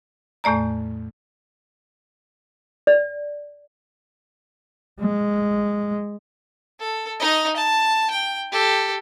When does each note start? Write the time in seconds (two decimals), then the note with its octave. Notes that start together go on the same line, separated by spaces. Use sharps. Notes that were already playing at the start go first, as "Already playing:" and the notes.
0.44 E2 A2 A3 D5 A#5
2.87 D5
5.00 G#3
6.80 A4
7.20 D#4 D#5
7.56 A5
8.10 G5
8.52 G4 A4